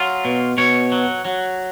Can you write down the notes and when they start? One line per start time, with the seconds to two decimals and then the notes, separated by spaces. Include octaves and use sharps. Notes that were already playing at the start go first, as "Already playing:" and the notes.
Already playing: F#3 F4
0.25 B2
0.58 B2 C#5
0.92 F#3
1.25 F#3